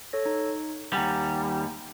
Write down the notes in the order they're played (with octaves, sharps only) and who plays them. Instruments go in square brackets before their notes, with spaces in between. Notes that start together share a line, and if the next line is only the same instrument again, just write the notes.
[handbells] A4 C#5 A#6
D#4
[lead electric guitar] D#2 G3 [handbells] F#5 G#5 A#5